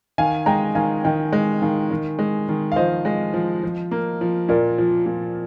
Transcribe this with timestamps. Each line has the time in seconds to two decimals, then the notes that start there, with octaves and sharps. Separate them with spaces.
0.18 D#3 F5 G#5
0.46 G#3 G5 A#5
0.75 D#3 F5 G#5
1.04 D#3 D#5 G5
1.33 G#3
1.62 D#3 F5 G#5
1.91 D#3
2.19 G#3
2.49 D#3
2.72 F5
2.76 F3 C5 D#5
3.05 G#3
3.34 F3
3.63 F3
3.91 A#3
4.21 F3
4.49 A#2 A#4 D5
4.78 F3
5.06 A#2